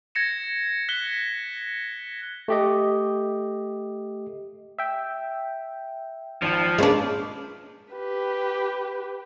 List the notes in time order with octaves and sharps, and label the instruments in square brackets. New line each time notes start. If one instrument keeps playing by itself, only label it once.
[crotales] G#6 A#6 C#7 E7
F#6 B6 G7
[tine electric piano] A3 G4 D#5
[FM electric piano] E5 G5
[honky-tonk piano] G#1 A5 [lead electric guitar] F3
[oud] G#3 D4 [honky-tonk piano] A#3 C#4 B4
[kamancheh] G4 B4